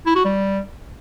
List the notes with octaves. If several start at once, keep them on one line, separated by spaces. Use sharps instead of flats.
E4
F#4
G3